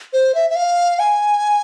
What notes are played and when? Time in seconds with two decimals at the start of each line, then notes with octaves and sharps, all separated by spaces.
0.13 C5
0.35 E5
0.50 E5
0.55 F5
0.99 G#5